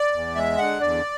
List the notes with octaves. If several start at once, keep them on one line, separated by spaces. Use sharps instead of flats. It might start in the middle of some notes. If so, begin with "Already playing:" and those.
Already playing: D5
E2
G#3 E5
D3 F#5
E2 D5